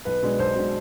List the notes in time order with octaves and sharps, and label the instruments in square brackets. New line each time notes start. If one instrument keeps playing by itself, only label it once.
[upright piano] B1 [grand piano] B4
[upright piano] B2 G#3 D4
[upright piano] B1 [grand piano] C5
[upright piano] B2 G#3 D4